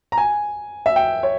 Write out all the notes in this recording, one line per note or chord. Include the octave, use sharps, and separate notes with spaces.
A#5
G#5
E5
G5
C#5